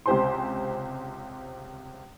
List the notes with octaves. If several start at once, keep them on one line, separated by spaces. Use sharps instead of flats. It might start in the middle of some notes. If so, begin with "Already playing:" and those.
C#2 C3 G4 C5 G#5 C6